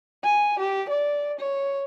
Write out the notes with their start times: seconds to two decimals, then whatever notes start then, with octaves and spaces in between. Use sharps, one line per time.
0.23 G#5
0.60 G4
0.89 D5
1.39 C#5